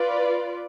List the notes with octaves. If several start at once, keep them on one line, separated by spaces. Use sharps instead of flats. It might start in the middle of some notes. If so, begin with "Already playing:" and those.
Already playing: F4 B4 D5